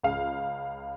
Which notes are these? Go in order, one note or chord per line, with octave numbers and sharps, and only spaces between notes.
C#2 F5